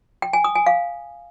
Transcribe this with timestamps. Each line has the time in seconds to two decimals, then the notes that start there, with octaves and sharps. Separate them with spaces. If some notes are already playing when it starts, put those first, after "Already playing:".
0.22 G5
0.33 G#5
0.44 D#6
0.55 G#5
0.66 F5